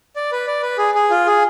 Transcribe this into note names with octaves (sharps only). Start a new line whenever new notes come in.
D5
B4
D5
B4
G#4
G#4
F4
G#4